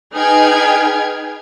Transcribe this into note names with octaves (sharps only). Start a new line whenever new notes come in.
D#4 G#4 B4 G5 F6 G#6